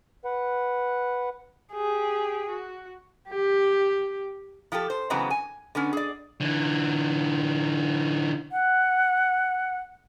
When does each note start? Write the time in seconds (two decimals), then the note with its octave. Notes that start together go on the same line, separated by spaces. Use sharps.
0.25 B4 F#5
1.72 G4 G#4
2.50 F#4
3.29 G4
4.72 F3 F4 G4 A4
4.90 C5
5.10 C#3 E3 F#3 G#3 B3 C4
5.30 G#5
5.75 D3 B3 C#4
5.93 G#4 D5
6.41 D3 E3
8.52 F#5